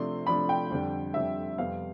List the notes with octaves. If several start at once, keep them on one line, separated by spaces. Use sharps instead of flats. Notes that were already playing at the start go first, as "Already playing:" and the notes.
Already playing: C3 F3 A3 D4 C6
C3 F3 A3 D4 B5
G5
F2 D3 G3
F2 D3 G3 E5
F2 C3 G3 B3 F5